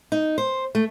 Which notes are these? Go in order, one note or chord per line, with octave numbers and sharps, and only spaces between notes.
D#4
C5
A3